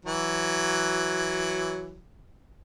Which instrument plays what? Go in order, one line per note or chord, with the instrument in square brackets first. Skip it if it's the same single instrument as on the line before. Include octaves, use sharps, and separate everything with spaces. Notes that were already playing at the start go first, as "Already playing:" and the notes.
[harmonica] E3 F#3